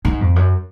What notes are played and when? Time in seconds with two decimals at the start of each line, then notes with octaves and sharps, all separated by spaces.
0.05 G#2
0.21 F2
0.36 F#2